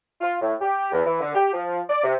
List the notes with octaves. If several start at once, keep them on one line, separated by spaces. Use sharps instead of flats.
F4
A2
G4
E2
E3
D3
G4
F3
D5
C3